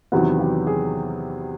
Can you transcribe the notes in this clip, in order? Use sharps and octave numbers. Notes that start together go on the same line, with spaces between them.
E2 C3 D#3 F#3 B3 F#4
G4
G#4